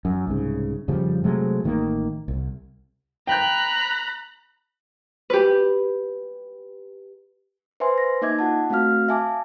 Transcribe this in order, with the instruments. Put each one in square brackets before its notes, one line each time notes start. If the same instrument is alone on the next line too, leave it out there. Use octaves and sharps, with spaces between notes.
[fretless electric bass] F#2
C2 G#2 C#3
F2 C#3 F3 G3
C3 F#3 G#3 A3
A1 D#3 E3 A#3
C2
[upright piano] G5 G6 [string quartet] A#5 B5 F#6
[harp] G4 B4
[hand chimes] B4 C5 E5 G#5 C6
A#6
A#3 D#4 D#5 E5 D6 G#6
F4 F#5 A5
A3 C4 F#4 F5 F6
E5 F5 G#5 A5 D6